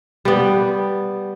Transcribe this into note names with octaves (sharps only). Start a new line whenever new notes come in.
G3 B3